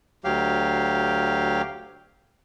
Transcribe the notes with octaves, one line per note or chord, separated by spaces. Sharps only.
D2 F#3 G4 F5